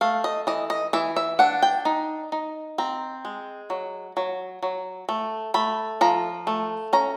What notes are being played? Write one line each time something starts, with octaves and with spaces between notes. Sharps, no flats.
A3 F5
D#5
E3 D#5
D#5
E3 E5
E5
D4 F#5
G5
D#4
D#4
C4 A#5
G#3
F#3
F#3
F#3
A3
A3 B5
F3 A#5
A3
C#4 A#5